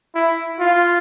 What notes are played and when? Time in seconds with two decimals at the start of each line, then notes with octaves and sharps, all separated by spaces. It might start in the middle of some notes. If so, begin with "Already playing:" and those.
0.15 E4
0.59 F4